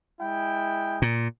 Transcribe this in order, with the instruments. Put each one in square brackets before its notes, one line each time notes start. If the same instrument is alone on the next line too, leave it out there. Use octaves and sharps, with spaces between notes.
[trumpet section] G#3 E4 G5
[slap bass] A#2